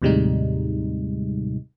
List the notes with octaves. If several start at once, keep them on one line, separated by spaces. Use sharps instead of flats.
D#2 A2 C3 G3 G#3 D#4